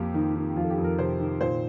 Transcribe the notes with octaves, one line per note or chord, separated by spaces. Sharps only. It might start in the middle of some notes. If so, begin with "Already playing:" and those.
Already playing: F2 A#3 G4
D#3 D#4
D#3
F2 F4
A4
G4
F2
A#4
C3 C5
D#3
A#2 C5